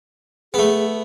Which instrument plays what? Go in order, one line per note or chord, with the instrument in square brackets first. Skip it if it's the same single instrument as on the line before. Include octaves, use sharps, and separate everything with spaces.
[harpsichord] A3 B3 [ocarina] G#4